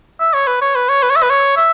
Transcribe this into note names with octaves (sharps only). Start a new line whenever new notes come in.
E5
C#5
B4
C#5
B4
C#5
B4
C#5
E5
B4
C#5
E5